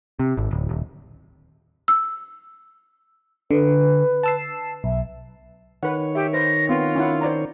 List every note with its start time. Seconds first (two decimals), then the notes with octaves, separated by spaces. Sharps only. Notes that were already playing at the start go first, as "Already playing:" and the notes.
0.19 C3
0.38 G#1
0.51 D1
0.69 D#1
1.88 E6
3.51 D3 B4
4.23 A5 E6 C7
4.84 B1 E5
5.83 D#3 B4 C#5 F#5
6.15 G4 E5
6.33 B4 C5 A#6
6.69 B3 C4 F4
6.96 C#4 E4 F#5
7.21 C5 D5 A#5